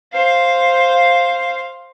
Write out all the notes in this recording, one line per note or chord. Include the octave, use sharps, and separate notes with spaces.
C5 F5